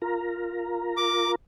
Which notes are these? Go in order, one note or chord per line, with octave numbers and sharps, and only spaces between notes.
F4 A#4 A#5
D6